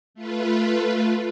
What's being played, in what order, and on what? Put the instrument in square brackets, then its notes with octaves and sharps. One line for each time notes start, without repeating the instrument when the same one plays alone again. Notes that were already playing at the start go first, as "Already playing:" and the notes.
[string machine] A3 F4 B4